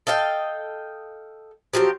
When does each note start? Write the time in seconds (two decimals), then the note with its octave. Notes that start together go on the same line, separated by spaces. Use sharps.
0.07 A4 D#5 F5 G5
1.74 F3 F#3 C4 G4